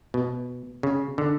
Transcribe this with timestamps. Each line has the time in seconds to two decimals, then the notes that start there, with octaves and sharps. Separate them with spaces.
0.14 B2
0.83 C#3
1.18 D3